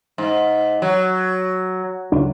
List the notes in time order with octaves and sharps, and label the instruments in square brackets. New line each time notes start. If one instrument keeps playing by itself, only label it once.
[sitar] G#2
F#3
[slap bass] C#2 F#3 D4